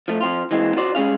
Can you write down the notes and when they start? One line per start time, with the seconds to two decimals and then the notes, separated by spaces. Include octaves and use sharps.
0.08 F3 A3
0.21 F3 C4 F4
0.51 E3 G#3 A#3 C4
0.76 F4 F#4 C5 D5
0.95 G3 G#3 C#4 G#4 F5